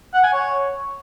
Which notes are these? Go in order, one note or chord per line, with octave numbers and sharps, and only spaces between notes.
F#5
G#5
C#5